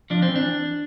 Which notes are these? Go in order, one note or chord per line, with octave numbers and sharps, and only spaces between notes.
F3 D4
C4
E3
D4